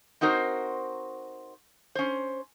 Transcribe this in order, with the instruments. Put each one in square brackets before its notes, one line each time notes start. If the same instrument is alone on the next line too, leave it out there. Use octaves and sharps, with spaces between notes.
[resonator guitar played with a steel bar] C4 D#4 F#4 A#4 C5
C#4 C5